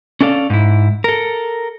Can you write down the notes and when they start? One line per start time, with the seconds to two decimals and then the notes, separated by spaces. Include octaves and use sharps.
0.21 C#4 D4 A4 D5 F5
0.50 G#2 E4
1.04 A4 A#4